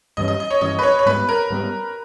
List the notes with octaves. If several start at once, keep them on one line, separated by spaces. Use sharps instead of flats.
G2 E3 G3 C#4 D#5
D#5
D#5
C#5
G2 E3 G3 C#4 D#5
B4
C#5
C#5
G#2 G3 B3 B4
A#4
G#2 G3 B3